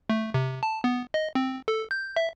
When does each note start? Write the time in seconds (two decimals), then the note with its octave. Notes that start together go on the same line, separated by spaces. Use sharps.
0.10 A3
0.34 C3
0.63 A5
0.84 B3
1.14 D#5
1.35 C4
1.68 A4
1.91 G6
2.16 E5